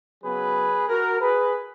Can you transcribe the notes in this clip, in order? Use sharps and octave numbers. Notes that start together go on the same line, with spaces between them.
C#3 F#3 B3 G#4 B4
F#4 A#4
G#4 B4